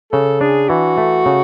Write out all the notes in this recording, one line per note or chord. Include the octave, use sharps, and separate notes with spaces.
C#3 A4
D4 G#4
E3 F#4
A3
C#3